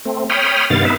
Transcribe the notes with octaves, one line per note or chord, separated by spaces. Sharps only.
A3 C4
C#5 G5 B5 D#6 F6
G2 C3 D#3 B3 F5 A6
B3 D#4 B4 E5